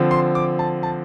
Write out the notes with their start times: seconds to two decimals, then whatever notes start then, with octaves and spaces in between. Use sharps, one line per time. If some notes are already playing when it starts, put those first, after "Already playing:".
Already playing: D3 F3 C4
0.11 C6
0.35 D6
0.59 A5
0.83 A5